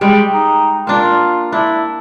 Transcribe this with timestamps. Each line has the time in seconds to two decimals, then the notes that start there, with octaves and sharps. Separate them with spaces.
0.01 G3 G#3 G5
0.33 D#4
0.87 A#3 D4 F4
1.52 D4 E4